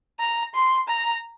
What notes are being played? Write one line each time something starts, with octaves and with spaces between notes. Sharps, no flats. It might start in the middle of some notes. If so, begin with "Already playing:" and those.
A#5
C6
A#5